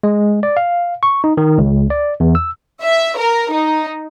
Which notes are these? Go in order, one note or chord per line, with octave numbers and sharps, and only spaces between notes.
G#3
D5
F5
C#6
D#4
D#3
C#2
D5
E2
E6
E5
A#4
D#4